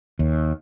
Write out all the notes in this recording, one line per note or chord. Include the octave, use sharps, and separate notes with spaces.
D#2